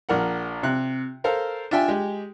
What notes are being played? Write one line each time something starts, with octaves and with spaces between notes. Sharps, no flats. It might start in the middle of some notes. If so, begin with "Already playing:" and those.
A#1 A#4 F#5
C3 F#6
A4 A#4 C5 F5
D4 F4 E5 G5 G#5
G#3 G4